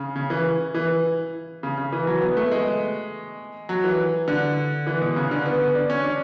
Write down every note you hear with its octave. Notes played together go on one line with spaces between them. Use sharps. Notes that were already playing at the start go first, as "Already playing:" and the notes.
Already playing: C#3
C#3
E3
E3
C#3
C#3
E3
F#3
B3
A3
G#3
F#3
E3
D3
E3
B2
C#3
D3
B3
D4
C#4
D4